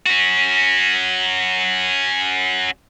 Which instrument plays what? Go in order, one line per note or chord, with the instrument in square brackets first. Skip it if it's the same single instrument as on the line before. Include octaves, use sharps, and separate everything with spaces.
[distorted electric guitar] C#4 F#4